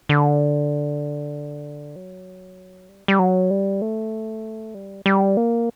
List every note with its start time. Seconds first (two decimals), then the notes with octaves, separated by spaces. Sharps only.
0.09 D3
1.96 F#3
2.89 G3
3.08 G3
3.19 F#3
3.50 G3
3.82 A3
4.75 G3
5.06 G3
5.37 A#3